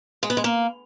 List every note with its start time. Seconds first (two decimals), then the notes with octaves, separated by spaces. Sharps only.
0.23 G#3
0.30 B3
0.37 G#3
0.44 A#3